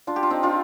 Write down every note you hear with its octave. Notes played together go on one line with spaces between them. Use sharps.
D4 F4
G4
F4
C4 D#4
D4 F4